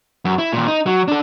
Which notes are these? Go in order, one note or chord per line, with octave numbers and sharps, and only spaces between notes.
F#2
E4
D#2 A#2
D#4
F#3
D4 A4